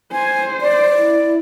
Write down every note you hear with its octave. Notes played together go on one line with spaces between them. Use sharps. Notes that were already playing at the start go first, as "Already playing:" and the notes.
C5 G#5
D5
E4